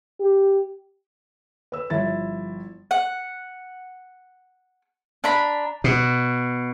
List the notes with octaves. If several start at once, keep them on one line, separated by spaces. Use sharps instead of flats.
G4
B4 E6
G1 F3 E4 A6
F#5
D4 A#5 B5
B2